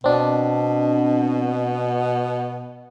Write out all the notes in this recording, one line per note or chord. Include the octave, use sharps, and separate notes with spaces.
B2 C4 D4